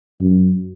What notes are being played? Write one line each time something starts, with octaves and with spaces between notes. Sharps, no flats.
F#2